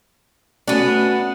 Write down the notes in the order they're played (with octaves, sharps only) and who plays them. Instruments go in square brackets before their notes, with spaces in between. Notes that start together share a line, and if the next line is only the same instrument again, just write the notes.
[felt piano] A3 C#4 F#4 [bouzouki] B3 D4